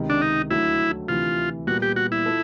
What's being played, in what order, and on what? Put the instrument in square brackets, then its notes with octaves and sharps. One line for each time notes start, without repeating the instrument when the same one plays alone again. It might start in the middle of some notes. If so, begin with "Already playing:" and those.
Already playing: [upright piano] C#2 C3 D#3
[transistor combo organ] D4
D#4
[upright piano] D2 D3 F#3 A3 [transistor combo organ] E4
[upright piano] D2 C3 E3 [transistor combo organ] F4
[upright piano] A#2 G3 B3 [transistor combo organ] F#4
[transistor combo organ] G4
F#4
E4
[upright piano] F4 A4